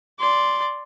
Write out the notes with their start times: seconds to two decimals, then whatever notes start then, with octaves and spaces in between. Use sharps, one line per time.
0.20 D5 C6